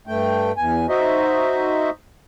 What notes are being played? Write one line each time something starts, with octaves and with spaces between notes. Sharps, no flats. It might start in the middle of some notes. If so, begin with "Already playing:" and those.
G2 A3 G5
E2 G#5
D#4 F#4 C5 D#5 E5